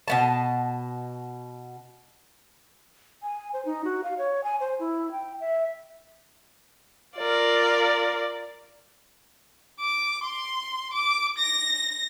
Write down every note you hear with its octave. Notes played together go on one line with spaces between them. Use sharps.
B2 B3 A5
G#5
C5
D#4
F#4
F5
C#5
G#5
C5
E4
G5
E5
F4 A#4 D5
D6
C6
D6
A#6